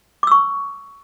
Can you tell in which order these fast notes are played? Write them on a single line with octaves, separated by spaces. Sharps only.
D6 E6 C#6